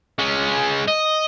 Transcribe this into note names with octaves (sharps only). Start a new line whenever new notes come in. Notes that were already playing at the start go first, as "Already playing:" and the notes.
G#3 C#4
D#5